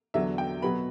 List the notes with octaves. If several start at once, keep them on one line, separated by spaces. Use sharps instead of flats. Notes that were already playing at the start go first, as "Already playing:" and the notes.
E2 D3 F#3 E5
G5
B2 F#3 B3 B5